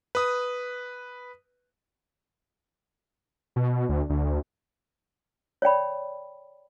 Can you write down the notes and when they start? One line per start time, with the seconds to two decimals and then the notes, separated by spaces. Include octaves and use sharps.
0.15 B4 D#6
3.56 B2
3.89 D2
4.10 D2
5.62 C#5 D5 G5 B5